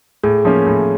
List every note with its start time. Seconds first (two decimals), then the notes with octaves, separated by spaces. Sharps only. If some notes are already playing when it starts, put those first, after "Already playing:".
0.24 A2 G#4
0.45 F3 A#3 C#4
0.67 A2